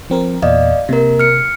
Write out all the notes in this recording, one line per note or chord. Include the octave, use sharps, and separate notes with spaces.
F3 C4 A#4
E2 A#2 D5 D#5 F5
C3 A#3 A#4
F6 C#7